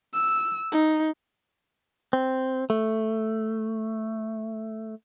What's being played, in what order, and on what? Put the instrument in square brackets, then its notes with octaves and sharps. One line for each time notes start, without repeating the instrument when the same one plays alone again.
[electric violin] E6
D#4
[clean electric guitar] C4
A3